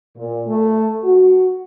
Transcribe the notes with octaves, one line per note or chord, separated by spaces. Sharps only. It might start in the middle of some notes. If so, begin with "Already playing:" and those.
A#2
A3
F#4